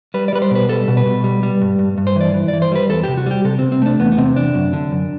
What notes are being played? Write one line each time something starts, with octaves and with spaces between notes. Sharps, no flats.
G3 B4
D5
G3 B4
C5
B2 B4
G3 A4
B2
B4
B2
G3
G3
G2
G2
G2
C5
E3 D5
E3
D5
E3
C5
G3 B4
E2 A4
C3 G4
F#4
G3 G4
C3 A4
C3 C4
C4
A3 D4
E2 B3
B3
C3 C4
E2 D4
F#2
D3
F#2